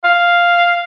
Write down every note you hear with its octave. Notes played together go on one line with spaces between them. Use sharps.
F5